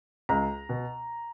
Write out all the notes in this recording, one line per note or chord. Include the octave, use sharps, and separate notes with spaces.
C#2 A#5
B2